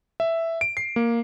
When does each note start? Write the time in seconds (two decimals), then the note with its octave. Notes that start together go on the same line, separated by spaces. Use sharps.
0.20 E5
0.61 D7
0.77 C7
0.96 A#3